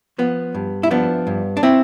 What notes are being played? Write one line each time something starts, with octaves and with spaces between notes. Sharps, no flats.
F3 B3
G2
E4
F3 B3 D4
G2
D4
C4 E4